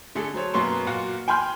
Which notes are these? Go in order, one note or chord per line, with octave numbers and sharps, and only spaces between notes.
D3 A3 G#4 A4
F#3 C5 C#5
F#2 B2 A#3 B3 C6 C#6
A#2 F4 F#4
G5 G#5 B5 C6 F6 G6